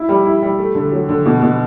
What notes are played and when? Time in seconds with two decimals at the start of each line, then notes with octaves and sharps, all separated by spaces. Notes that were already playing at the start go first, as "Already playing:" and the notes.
Already playing: E4
0.09 G3
0.25 E4
0.42 G3
0.59 A3
0.75 D3
0.92 F#3
1.09 D3
1.26 B2
1.42 B2